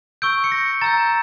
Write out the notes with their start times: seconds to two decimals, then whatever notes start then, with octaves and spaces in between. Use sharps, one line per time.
0.22 C#6 E6 G6 D7
0.44 C#7
0.52 A#6
0.81 A#5 E6 G6 A6